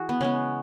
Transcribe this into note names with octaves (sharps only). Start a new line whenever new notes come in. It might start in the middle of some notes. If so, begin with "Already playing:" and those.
Already playing: E3 F#4 G#4
B3
C#3 G#3 B3 C#4